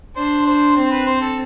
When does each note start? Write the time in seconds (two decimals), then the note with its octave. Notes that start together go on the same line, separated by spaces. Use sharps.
0.16 D4 C5
0.46 C5
0.76 C4 C5
0.91 B4
1.06 C5
1.21 A4